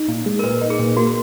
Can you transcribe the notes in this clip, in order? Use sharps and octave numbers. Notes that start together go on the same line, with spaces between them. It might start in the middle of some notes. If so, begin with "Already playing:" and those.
Already playing: D#4
A#2
G#3
A#4
A#2 B4
D#4
G#4
A#2
A#3 F#4